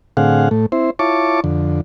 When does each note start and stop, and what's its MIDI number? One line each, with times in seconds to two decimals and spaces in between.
0.17 0.49 45
0.17 0.49 50
0.17 0.49 60
0.17 0.49 68
0.17 0.49 77
0.17 0.49 78
0.51 0.66 45
0.51 0.66 57
0.72 0.90 60
0.72 0.90 64
0.72 0.90 72
0.99 1.40 64
0.99 1.40 65
0.99 1.40 73
0.99 1.40 81
0.99 1.40 85
0.99 1.40 86
1.44 1.81 41
1.44 1.81 50